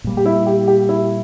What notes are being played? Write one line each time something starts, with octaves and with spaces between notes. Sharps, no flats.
A#2 G3 A#3
G4
E4
G4
G4
E4